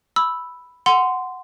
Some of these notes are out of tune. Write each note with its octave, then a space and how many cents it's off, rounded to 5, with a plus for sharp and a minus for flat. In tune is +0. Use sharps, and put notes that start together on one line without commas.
B5 +0 E6 +0
F#5 +0 C6 -15